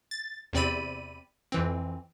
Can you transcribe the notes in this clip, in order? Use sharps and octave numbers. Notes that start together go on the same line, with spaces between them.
A6
E2 C3 C4 D5 B5 D#7
F2 E3 C4